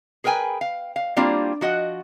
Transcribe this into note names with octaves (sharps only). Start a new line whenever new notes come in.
G#4 A#4 B4 G5 G#5
F5
F5
G3 A#3 C4 D4 E4 F4
F3 F#4 D#5 F#5